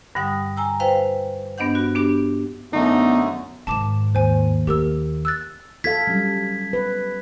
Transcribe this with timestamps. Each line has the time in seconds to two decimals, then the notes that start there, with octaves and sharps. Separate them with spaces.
0.15 G2 D3 G3 F#5 D#6
0.57 G#5 A#5 E6
0.80 F4 B4 C5 F5 G5
1.58 G2 B3 D4 D#5 F#5 G6
1.75 F#4
1.95 B3 D4 G4
2.73 F#2 D3 A3 B3 D#4
3.67 G#2 D#3 A5 D6 E7
4.15 D#2 C5 G#5
4.67 A#3 G4 A#4 E6
5.25 E6 F#6 A6
5.84 F4 A4 F5 G#6 B6
6.07 F#3 G3 C#4
6.73 B4